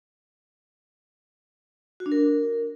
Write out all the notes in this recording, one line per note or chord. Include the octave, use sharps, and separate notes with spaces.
F#4
D4
A#4